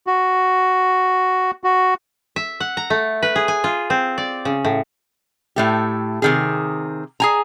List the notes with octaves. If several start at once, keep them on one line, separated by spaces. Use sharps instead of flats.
F#4
F#4
E5
F#5
A#5
A3
B4
G#4
G#5
F4
C4
D5
C#3
A2
A2 A3 G4
C3 D#3 G#4
G#4 G#5 A#5